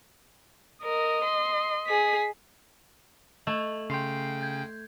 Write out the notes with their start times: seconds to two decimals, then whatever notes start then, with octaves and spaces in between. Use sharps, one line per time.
0.83 A#4 D#5
1.24 C6
1.87 G#4 B6
3.47 A3 D#5 F#7
3.90 C#3 G5 C6 C7
4.41 G6 G#6